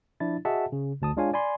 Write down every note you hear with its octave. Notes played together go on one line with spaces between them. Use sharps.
F3 D4 E4 A6
F#4 G#4 D#5 E5 F#5 A5
C#3
G1 D2 A5 D#6
G#3 D4 F4 C#5 F5 G#5
D5 G#5 B5 C6